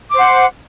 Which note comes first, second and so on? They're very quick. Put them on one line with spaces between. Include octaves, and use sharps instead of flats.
D6 C5 F#5